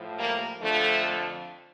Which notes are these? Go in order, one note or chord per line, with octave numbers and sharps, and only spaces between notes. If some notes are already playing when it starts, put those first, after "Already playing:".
Already playing: A2 F3
G3 A#3
F2 D3 F3 A3